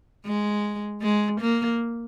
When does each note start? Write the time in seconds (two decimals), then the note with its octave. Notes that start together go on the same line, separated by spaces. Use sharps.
0.26 G#3
1.02 G#3
1.40 A#3